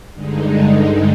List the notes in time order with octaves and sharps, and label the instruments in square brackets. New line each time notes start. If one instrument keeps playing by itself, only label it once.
[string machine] G2 D3 G#3 D#4